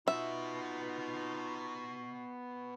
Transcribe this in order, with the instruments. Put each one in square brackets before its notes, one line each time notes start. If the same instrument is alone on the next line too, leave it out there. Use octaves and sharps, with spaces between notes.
[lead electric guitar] B3 F#4 [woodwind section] D#4 F4 [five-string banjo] E5